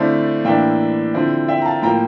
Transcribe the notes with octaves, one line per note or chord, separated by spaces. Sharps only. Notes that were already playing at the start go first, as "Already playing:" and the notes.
Already playing: D3 A3 C4 E4 D5 F5
A2 E3 A#3 D4 E5 G5
D3 F3 C4 E4
E5 G5
A#5
F5 A5
A2 F3 A#3 G5 A#5